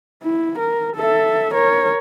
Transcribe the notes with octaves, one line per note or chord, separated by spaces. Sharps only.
E4
A#4
A4 E5
A#4 C#5